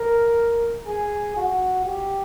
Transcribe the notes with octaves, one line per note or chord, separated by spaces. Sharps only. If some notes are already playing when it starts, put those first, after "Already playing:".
Already playing: A#4
G#4
F#4
G4